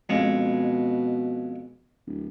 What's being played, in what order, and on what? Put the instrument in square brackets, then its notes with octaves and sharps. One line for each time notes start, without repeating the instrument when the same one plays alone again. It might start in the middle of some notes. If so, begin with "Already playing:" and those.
[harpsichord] F2 G#3 C#4 [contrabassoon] B2
[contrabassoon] D1